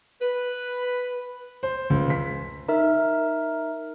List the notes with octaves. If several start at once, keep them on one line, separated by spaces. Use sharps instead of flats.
B4
C5
C#2
B6
D#4 A#4 E5